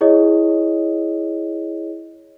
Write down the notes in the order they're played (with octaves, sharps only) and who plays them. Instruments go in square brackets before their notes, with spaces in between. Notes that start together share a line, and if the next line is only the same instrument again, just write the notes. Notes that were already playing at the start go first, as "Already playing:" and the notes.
[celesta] E4 G#4 C#5 D#5